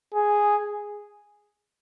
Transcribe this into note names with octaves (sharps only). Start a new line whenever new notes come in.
G#4